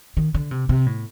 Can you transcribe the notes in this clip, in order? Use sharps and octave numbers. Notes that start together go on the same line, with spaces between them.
D#3
D3
C3
C3
A2